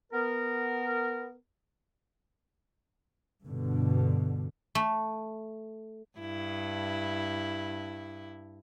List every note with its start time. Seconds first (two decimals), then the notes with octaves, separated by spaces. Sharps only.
0.13 B3 A#4
3.45 G2 B2 D3
4.75 A3
6.19 G2 E4